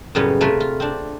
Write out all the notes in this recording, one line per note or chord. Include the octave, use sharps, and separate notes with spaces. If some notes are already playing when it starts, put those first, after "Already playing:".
F#2 A2 C#3 G3 B3 C#4
C3 A3 F4 A#4 B4 G#5
F4
C4 D4